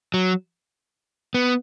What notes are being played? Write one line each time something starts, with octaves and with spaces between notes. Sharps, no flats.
F#3
B3